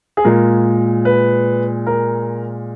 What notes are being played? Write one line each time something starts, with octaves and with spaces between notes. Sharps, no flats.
G#4
A#2 G#3 A#4
B4
A#4